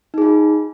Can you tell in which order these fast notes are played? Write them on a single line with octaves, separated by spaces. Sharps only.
D#4 G#4 F4